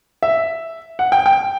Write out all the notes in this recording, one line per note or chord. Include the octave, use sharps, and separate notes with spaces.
E5
F#5
G5
G5